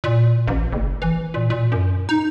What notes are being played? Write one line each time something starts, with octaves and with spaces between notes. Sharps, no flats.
A#2
A1
F#1
E3
A#2
A#2
F#2
D#4